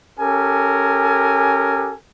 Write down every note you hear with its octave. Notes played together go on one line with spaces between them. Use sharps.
C#4 G4 A4 A#4 G#5